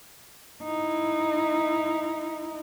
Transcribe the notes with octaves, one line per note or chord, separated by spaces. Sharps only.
D#4 E4